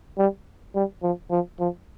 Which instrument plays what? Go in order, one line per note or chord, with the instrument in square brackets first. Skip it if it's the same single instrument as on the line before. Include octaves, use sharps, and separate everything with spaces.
[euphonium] G3
G3
F3
F3
F3